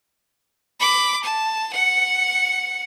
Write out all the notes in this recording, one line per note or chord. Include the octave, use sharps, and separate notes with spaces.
B5 D6
A5
F#5 C#7